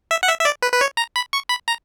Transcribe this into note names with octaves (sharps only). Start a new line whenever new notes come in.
E5
F#5
E5
E5
D5
B4
B4
C#5
A#5
B5
C#6
B5
A#5